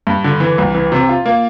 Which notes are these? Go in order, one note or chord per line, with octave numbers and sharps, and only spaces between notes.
G2
D3
E3
C2
E3
C3
F4
A#3